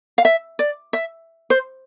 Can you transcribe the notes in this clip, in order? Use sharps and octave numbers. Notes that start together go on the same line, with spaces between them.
F5
E5
D5
E5
C5